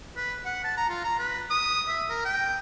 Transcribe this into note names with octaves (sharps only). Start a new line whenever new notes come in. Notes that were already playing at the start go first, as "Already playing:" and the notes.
B4
F#5
A5
A#5
F4
A#5
B4
D#6
E5
A#4
G5